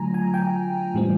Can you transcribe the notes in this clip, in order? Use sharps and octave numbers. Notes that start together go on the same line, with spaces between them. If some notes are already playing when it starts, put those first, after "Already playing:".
Already playing: D3 F#3 A3 F4 G#5 A#5
G#5
G5
A2 E3 G3 C4